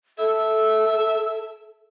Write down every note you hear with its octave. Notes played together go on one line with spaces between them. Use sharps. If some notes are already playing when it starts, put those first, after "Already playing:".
A4 E5